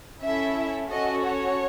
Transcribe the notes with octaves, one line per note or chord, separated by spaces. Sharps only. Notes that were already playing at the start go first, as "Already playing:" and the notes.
C#4 E4 A4 E5
C#4 F#4 A4 D#5
C#5